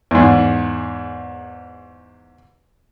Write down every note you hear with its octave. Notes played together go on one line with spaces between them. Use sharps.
E2 G#2